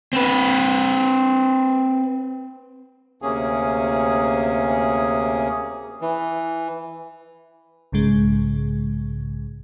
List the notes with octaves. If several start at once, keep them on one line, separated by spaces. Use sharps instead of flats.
C4 B4
D2 C3 A#3 C#4 G#4
E3
B1 G#2 C#3 G#3